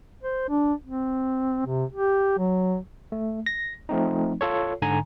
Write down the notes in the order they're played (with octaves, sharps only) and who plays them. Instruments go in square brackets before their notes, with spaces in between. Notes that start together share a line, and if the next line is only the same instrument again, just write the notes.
[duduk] C5
D4
C4
C3
G4
F#3
[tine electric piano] A3
A#6
F3 A3 C4 D#4
F4 A4 C#5
G#2 D3 G#5 A#5